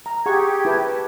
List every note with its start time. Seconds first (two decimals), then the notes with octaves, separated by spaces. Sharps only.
0.06 A#5
0.26 G4 G#4 F#5 C#6 G#6
0.65 E4 B4 A5